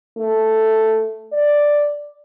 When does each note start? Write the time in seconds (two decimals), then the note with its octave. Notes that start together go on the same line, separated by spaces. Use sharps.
0.17 A3
1.33 D5